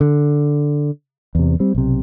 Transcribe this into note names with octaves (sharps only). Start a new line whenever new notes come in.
D3
E2 C3
G3 C4
B1 C3